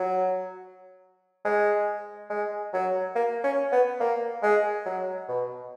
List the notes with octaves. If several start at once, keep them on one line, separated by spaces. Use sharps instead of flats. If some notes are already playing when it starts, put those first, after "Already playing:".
Already playing: F#3
G#3
G#3
F#3
A#3
C#4
B3
A#3
G#3
F#3
B2